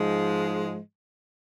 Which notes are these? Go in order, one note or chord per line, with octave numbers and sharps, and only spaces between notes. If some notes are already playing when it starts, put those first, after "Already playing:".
Already playing: G#2 F3 G#3